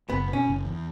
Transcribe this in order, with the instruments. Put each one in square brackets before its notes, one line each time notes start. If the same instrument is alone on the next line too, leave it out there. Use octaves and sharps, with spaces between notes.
[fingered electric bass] F#1 [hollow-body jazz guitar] B3
[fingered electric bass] B2
[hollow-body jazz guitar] C#4
[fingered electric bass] F#1
E2